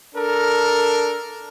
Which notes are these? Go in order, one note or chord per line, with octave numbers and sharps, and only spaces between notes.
D4 A4 A#4